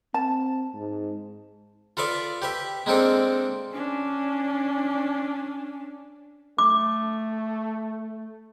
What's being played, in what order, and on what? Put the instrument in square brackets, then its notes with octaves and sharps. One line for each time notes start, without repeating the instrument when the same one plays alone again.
[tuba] C4 [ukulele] A5
[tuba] G#2
[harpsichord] F4 A4 B4 D5 E5
G4 B4 E5
G#3 A#3 C4 D4 A4
[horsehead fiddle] C#4 D4
[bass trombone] A3 [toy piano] D6